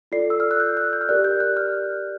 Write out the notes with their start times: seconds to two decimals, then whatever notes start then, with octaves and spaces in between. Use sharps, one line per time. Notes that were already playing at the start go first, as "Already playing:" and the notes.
0.12 F4 A4 D5 C7
0.30 E6
0.40 F6
0.51 F#6
0.60 G6
0.77 F#6
0.93 G6
1.01 F6
1.09 G4 A#4 D5 F#6
1.24 G6
1.40 F#6
1.57 F6